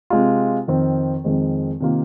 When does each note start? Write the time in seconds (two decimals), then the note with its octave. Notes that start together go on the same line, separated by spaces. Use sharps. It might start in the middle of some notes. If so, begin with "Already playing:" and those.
0.10 C3 G#3 F4
0.67 F2 D#3 C4
1.24 F2 D#3 G#3 C4
1.80 C3 D#3 A#3 F4